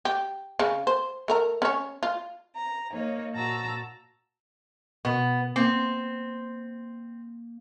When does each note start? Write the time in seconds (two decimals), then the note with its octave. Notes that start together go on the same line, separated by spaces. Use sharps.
0.05 G4
0.59 C#3
0.87 C5
1.28 A3 A#4 A#5
1.62 C#4 C#5
2.03 F4
2.55 A#5
2.92 A#3 D#4 C#5
3.33 A#2 F#4 A5 A#5 E6
5.05 B2 B3
5.56 A#3 C4